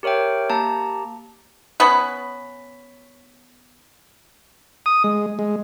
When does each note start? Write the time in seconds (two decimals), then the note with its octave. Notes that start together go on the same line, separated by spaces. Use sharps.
0.03 G4 A#4 C#5 E5 G5
0.50 A#3 G4 A5 A#5
1.80 B3 C#4 B4
4.86 D#6
5.04 G#3
5.39 G#3